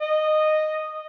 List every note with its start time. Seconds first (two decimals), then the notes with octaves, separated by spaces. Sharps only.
0.01 D#5